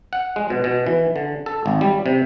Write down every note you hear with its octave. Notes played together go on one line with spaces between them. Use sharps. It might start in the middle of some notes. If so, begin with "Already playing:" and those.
F#5
G#3
B2
B2
E3
D3
A4
G#1
G3
C3